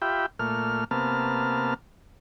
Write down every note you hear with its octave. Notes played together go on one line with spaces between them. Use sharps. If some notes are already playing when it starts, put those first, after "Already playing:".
F4 G4 E5 G5 B5
A#2 A3 F6
C3 A#3 B3 A5 F6